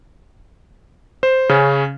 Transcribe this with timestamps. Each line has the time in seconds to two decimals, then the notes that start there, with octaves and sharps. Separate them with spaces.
1.23 C5
1.49 C#3 C#4